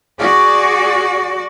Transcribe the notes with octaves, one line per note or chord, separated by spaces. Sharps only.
F#4 G#4 D5